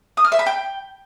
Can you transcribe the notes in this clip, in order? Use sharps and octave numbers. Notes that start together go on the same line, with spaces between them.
D#6
F6
E5
B5
G5